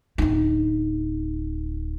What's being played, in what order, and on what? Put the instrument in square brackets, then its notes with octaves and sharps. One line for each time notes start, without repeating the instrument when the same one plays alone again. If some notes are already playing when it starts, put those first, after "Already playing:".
[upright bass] D1 D#4